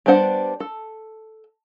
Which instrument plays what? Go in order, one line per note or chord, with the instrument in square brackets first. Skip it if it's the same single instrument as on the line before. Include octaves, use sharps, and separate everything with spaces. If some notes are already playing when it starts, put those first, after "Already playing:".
[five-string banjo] G3 B3 D4 C5 F#5
A4